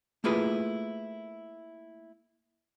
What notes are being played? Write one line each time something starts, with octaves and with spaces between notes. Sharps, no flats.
A3 A#3 E4 F4 G#4 B4